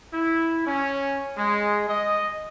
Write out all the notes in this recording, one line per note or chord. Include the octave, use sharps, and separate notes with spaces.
E4
C#4
G#3
D#5